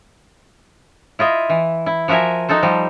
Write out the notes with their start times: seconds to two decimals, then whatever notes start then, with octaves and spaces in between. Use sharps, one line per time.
1.19 E4 F4 D#5 E5
1.50 E3
1.86 E4
2.08 F3 F#4 A#4 E5 G#5
2.49 D#4 F#4 A4 C5
2.63 F3 G3